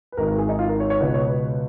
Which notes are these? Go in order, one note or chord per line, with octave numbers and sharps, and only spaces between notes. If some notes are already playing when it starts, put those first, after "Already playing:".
B4
G#1 G#2 D#3 A#4
A#4
G#4
D#4
F4
A#4
C#5
C#5
C#2 B2 B4
C#5
B4